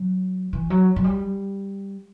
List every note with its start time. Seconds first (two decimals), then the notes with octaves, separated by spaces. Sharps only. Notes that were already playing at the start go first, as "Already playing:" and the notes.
Already playing: F#3
0.53 E3
0.70 F#3
0.96 F#3
1.04 G3